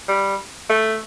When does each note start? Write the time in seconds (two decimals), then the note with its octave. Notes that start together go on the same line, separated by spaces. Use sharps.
0.08 G3
0.70 A3